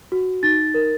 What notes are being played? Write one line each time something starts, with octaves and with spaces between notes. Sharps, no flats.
F#4
D#4 A6
A#4